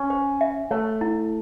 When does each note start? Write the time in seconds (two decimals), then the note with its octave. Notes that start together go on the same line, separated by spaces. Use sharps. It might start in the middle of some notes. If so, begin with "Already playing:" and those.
Already playing: C#4
0.10 C5
0.41 E5
0.71 A3 C#5
1.01 E4